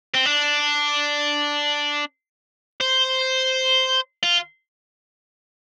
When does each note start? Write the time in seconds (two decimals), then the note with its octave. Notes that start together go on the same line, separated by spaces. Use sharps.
0.14 C4
0.26 D4
2.81 C5
4.23 F4